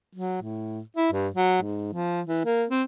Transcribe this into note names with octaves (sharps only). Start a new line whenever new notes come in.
F#3
A2
E4
G2
F#3
G#2
F3
E3
A#3
C4